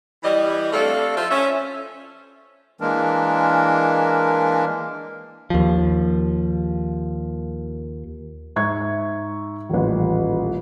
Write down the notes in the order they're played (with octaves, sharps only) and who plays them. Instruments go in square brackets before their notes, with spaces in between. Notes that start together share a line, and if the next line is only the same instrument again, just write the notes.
[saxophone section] E3 G3 D#5
A3 C4 D4 A4 E5 F5
F3 F4 A4 C5 E5
C#4 E5
[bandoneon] E3 G#3 A#3 D4 A#4
[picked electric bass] D#2 F3
[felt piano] G#2 E5 C#6 G#6
D#1 A1